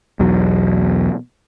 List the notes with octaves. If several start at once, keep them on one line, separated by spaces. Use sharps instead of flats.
B1 E2 B2 F#3